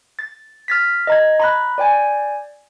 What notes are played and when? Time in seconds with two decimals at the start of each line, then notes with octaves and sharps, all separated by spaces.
0.19 A6
0.68 F6 A6 B6
1.07 D#5 A#5 G#6
1.40 A#5 B5 F#6
1.78 D5 G5 G#5